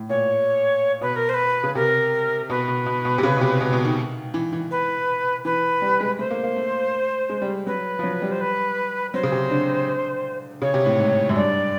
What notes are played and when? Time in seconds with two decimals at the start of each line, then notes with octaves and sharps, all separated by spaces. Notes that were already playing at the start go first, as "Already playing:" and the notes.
Already playing: A2
0.09 A#2 C#5
1.01 B2 B4
1.16 A#4
1.29 C5
1.34 B4
1.64 C#3
1.75 C3 A#4
2.50 B2 B4
2.68 B2
2.86 B2
3.05 B2
3.18 C3
3.23 C#3
3.36 B2
3.41 C3
3.61 B2
3.73 B2
3.85 D#3
4.34 E3
4.53 E3
4.71 B4
5.44 E3 B4
5.82 G3
6.00 G#3
6.19 A3 C5
6.31 A#3
6.43 A#3
6.56 A3
7.30 G#3
7.42 G3
7.67 F#3 B4
7.99 F3
8.03 F#3
8.22 G3
8.31 C5
8.41 B4
9.13 F#3 C5
9.23 C#3
9.32 C3
9.51 D3
10.62 C#3 C#5
10.74 C3
10.86 A2
10.99 G#2
11.29 F#2
11.35 G2 D5